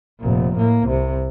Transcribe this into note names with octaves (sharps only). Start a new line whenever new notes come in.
F1 A#2
A2 A#3
C2 C3